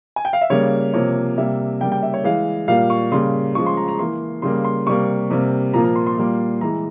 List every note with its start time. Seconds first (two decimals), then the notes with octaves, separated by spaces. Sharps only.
0.16 G#5
0.25 G5
0.33 F5
0.41 E5
0.50 C#3 G3 A#3 C#5
0.94 C3 F3 A#3 C#5
1.37 C3 G3 A#3 E5
1.81 C#3 G3 A#3 G5
1.92 G5
2.03 E5
2.14 C#5
2.24 E3 G#3 F5
2.68 A#2 G3 A#3 F5
2.90 C#6
3.12 C#3 G3 A#3 C6
3.55 C#3 F3 G#3 C#6
3.66 C6
3.77 A#5
3.88 A#5
3.99 E3 A#3 C6
4.42 C#3 G3 A#3 C6
4.64 C6
4.86 C3 G3 A#3 C#6
5.31 C3 G3 A#3
5.73 A#2 F3 A#3 A#5
5.84 A#5
5.96 C6
6.07 C6
6.18 A#2 G3 A#3
6.61 E3 G#3 A#5